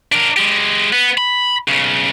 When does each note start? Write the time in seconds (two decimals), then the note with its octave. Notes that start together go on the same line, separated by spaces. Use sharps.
0.12 D4 A#4
0.37 G#3 G4
0.92 B3
1.18 B5
1.68 B1 C#3